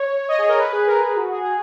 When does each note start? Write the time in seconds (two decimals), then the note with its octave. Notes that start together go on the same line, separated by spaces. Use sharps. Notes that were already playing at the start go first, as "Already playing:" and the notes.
Already playing: C#5
0.29 D#5
0.38 G#4
0.49 A#4
0.58 B4
0.72 G#4
0.80 B4
0.87 A#4
1.01 A#4
1.16 F#4
1.31 G#4
1.44 G#4